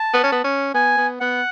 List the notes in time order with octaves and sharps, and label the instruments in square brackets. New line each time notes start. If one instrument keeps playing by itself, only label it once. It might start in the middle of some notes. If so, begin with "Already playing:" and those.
Already playing: [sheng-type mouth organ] A5
[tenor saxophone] B3
C#4
B3
C#4
[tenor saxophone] B3 [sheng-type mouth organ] G#5
[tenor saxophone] B3
[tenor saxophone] B3 [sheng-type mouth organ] F#5